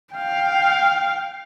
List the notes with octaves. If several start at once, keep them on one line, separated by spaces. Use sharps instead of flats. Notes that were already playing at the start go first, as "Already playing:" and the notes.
F5 G5